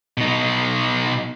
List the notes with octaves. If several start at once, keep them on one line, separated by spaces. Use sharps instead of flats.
B2 D#4